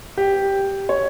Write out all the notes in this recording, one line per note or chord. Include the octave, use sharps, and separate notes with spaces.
G4
C#5